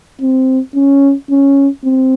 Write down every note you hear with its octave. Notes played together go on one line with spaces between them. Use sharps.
C4
C#4
C#4
C4